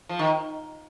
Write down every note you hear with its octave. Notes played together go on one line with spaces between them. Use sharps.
F3
D#3